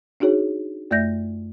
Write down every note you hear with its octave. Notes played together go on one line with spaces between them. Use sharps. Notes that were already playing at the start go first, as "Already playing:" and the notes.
D4 D#4 F#4 G#4 C#5
F#2 A3 D5 E5 G6 A#6